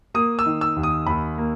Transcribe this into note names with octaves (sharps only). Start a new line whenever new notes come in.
A#3 D#6
E6
D#3
E6
D#2
D#6
D#2 B5
A#3